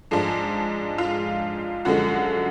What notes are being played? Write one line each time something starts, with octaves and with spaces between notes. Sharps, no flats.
G#2 F3 G#3 D4
F4
F#2 D3 F3 G#3 F#4